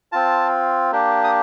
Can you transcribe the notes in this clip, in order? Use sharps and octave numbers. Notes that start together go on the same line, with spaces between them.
C4 F4 A5
A#3 D4 G4
D#6